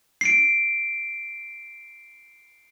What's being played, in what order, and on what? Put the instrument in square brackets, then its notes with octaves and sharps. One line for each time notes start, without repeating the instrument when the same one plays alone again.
[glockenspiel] C7 D7